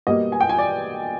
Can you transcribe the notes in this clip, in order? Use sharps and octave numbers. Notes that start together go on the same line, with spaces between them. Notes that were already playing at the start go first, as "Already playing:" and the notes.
B2 G3 A#3 D#5
G#5
G5
G#5
D5